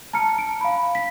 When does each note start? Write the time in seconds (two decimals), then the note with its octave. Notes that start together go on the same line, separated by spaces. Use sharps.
0.13 A5 A#5 F6 C#7
0.38 D7
0.61 F5 B5
0.95 B6